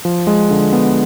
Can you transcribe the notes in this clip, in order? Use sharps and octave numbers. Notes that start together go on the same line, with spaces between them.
F3
G#3
D3
B3